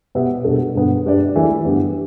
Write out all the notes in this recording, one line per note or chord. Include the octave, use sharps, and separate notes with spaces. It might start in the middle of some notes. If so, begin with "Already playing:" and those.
B2 B3 G4 E5
B2 G3 B3 D4 A4
G2 D3 B3
G2 G3 D4 B4 D5
E3 A3 E4 A4 E5
G2 D3 B3 G4